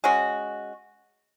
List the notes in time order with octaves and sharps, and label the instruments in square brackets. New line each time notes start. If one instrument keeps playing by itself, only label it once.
[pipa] G#3 C#4 F#4